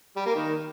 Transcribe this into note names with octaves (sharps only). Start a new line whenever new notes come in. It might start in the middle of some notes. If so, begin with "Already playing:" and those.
G3
A#3
D#3